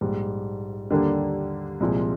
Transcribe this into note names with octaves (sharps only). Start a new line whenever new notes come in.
A#1 G#2 G3
D#2 D3 G3 A#3 D4
C2 A#2 F3 G#3